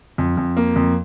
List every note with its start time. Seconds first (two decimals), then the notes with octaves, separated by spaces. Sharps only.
0.18 F2
0.37 F2
0.57 A#3
0.76 F2